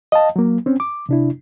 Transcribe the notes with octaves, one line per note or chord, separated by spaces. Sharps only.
D#5 F5 A5
F#3 A#3
C4 C#4
D6
C3 D4 E4